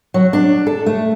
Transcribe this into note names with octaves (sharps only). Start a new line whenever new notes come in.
F#3
D4
A4
A3